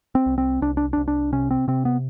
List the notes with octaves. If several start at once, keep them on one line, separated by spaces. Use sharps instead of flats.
C4
C2
C4
C2 D4
D4
D4
C2
D4
C3 C#4
C4
C3 C4
B3